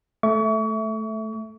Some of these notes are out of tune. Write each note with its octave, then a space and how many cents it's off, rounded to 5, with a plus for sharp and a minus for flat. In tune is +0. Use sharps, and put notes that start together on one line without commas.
A3 -10 E5 +0 C#6 +35